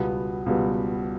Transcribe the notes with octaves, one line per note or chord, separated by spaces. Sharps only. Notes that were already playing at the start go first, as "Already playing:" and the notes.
Already playing: C#2 B2 G3 B3
C#2 B2 G3 B3